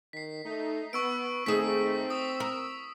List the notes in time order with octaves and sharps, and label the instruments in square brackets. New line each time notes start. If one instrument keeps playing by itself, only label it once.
[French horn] D#3 [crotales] B6 C7
[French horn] A3 [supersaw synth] D#4
[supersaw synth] B3 [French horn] B4 [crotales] C#6 E6 D7
[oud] D#2 G#4 [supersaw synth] A3 D#4 [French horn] C4 [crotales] B6
[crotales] D#6 [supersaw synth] E6
[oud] A#4